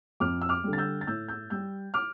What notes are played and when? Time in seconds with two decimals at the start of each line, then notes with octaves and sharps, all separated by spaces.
0.20 F2 D6 F6
0.42 E6
0.49 D6 F6
0.64 D3 G3
0.73 A6
0.78 E6 G6
1.01 A6
1.07 A2 E6 G6
1.28 E6 G6
1.50 G3 E6 G6
1.94 D6 F6